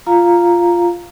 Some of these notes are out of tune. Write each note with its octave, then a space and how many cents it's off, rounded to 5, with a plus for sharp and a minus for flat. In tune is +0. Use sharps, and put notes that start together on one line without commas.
F4 -5 F5 -5 A#5 +0